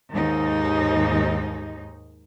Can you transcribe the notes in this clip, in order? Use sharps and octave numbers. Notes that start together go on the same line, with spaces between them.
D#2 G#2 D#4